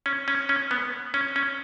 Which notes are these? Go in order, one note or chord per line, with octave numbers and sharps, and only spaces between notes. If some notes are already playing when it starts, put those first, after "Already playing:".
C#4
C#4
C#4
B3
C#4
C#4